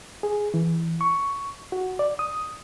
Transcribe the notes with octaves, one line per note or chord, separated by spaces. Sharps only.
G#4
E3
C#6
F#4
D5
D#6